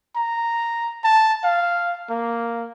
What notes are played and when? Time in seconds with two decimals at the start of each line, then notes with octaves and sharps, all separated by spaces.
0.16 A#5
1.04 A5
1.44 F5
2.10 A#3